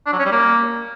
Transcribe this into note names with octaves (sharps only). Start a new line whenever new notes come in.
D4
F#3
C#4
G3
A#3